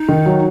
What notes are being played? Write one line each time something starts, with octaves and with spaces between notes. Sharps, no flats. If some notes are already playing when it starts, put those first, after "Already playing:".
Already playing: D#4
D#3
F#3